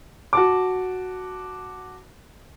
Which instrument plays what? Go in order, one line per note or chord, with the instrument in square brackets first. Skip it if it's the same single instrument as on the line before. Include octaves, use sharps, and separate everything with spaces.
[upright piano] F#4 A5 D6